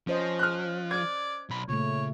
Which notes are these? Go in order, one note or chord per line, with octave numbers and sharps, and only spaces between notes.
F3 C#4 C5 D#5
F6 F#6
D5 G#6
B1 B5
A#2 C#3 A3 C#5